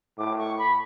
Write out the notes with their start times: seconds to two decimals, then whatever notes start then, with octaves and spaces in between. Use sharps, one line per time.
0.18 A2 D6
0.38 C#6
0.58 B5